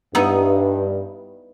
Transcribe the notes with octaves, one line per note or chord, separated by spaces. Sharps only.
G2 B3 D#4 E4